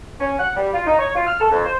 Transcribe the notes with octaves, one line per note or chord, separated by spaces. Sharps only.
C#4
F#5
G3
F4
D#4
C#5
F4
F6
A4
F2
C5